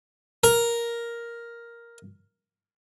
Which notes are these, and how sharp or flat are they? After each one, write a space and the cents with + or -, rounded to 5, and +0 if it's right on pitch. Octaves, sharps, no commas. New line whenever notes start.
A#4 +5